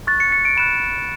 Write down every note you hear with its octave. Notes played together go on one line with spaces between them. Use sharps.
C#6 F#6 A6
C#7
C#7
D7
B5 F#6 E7